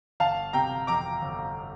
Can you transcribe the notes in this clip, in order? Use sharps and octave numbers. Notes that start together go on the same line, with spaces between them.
G1 F5 A5
C3 G5 A#5
F2 A#5 D6
G1